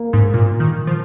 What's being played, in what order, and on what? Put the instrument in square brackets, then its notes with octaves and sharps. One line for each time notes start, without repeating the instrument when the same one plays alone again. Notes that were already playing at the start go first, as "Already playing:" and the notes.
Already playing: [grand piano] A#3
[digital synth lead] G#2
A#2
D#3
F3